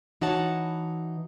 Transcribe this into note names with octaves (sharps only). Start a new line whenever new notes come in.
E3 D#4 F#4 C#5 F#5 A5